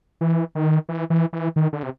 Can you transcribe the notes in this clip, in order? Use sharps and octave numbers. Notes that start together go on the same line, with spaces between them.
E3
D#3
E3
E3
E3
D#3
D3
C3